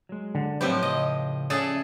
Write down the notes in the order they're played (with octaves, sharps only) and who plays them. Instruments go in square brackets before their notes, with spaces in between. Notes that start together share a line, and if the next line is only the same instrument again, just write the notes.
[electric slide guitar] F#3 G#3
[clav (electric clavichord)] D3
[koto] A2 F3 G4 [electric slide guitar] F#3 C4 [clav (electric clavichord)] B4 C5
[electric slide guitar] C#3 [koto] D#5
[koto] C#3 G#4 A4 [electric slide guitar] D5 E5